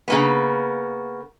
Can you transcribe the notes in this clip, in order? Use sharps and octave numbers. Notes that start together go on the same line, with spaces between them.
C#3 A#3 B3